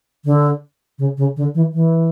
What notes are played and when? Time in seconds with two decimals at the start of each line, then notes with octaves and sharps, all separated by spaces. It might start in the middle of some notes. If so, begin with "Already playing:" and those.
0.25 D3
0.99 C#3
1.17 C#3
1.37 D3
1.55 E3
1.73 E3